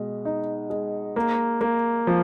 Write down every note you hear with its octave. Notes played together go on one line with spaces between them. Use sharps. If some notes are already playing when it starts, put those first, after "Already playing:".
Already playing: B2 G#3
D#4
G#3
A#3
A#3
F3